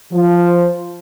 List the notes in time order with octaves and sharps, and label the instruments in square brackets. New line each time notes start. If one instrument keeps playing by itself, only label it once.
[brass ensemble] F3